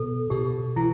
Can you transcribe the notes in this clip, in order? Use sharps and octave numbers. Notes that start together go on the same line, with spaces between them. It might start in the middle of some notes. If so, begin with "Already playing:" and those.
Already playing: B2 A4
B2 G4
E3 E4